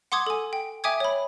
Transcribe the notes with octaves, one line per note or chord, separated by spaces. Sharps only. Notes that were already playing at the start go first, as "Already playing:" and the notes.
F#5 C6 D6 D#6 G#6
A4 G#5
G5
E5 G5 G#5 D6 D#6 G#6
C#5 B5